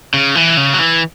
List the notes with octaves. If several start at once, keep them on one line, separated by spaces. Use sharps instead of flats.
C#3
E3
C#3
F#3
E3